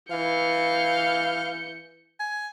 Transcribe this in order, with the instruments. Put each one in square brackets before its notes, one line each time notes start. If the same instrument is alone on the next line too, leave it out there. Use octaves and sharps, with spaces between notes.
[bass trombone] E3 [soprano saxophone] F5 [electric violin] G6 C#7
[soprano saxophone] G#5